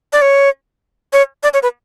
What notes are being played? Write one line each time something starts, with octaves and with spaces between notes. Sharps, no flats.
D5
C#5
C#5
D5
C#5
B4